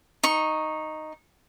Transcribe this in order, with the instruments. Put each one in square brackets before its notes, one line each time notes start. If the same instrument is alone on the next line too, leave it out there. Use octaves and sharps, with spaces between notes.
[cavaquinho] D#4 C#6